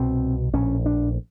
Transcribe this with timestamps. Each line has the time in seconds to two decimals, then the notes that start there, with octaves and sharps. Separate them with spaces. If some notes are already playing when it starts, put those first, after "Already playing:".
Already playing: C2 B2 C4
0.53 A#1 A2 C#4
0.86 D4